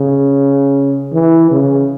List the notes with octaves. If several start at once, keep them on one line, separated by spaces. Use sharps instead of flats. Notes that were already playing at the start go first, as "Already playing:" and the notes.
Already playing: C#3
E3
C#3